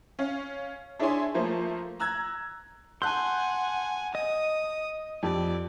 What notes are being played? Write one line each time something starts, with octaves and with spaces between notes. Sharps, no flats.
C#4 F5
D4 E4 G#4 C#5 G#5 C6
F3 A3 A#3 C5
A#5 E6 F#6 G#6
F#5 G#5 A5 C6 F#6 G6
D#5 D#6
F2 G4 D5